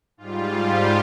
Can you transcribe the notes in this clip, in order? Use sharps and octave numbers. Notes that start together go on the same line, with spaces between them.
G#2 G3 F4
G4